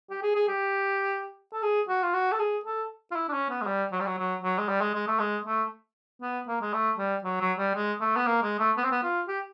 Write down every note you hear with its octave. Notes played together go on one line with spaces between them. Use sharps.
G4
G#4
G#4
G4
A4
G#4
F#4
F4
F#4
A4
G#4
A4
F4
E4
D4
C#4
B3
G#3
G3
F#3
G3
F#3
F#3
F#3
G#3
G3
G#3
G#3
A3
G#3
A3
B3
A#3
G#3
A3
G3
F#3
F#3
G3
G#3
A3
B3
A#3
G#3
A3
B3
C4
B3
F4
G4